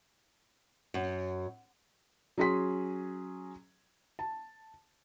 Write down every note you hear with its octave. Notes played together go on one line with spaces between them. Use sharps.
F#2
F#3 C#4 G#4 C6 B6
A5